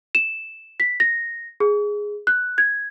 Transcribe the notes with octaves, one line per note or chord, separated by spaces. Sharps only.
E7
B6
A#6
G#4
F#6
G#6